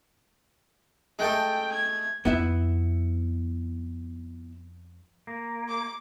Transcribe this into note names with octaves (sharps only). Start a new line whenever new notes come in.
G#3 A3 A4 G5
G#6
F2 B3 E4 E5
A#3
D6